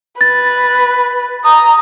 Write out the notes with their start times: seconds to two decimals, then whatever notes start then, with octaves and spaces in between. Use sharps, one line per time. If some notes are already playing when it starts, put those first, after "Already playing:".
0.21 B4 A6
1.45 A#5 D#6